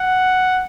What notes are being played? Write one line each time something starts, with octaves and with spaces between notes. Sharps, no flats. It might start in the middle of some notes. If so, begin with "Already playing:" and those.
Already playing: F#5